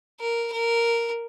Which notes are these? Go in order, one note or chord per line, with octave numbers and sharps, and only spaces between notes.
A#4
A#4